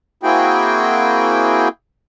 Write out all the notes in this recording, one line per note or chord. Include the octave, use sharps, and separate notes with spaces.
A#3 C4 E4 F#4 G#4 G5